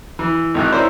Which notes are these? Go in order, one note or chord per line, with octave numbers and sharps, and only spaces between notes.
E3
G#1 D#3 F#6
C#4 E4 A#4 C5 D5